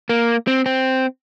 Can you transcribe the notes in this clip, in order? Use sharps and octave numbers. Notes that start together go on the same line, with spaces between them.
A#3
C4
C4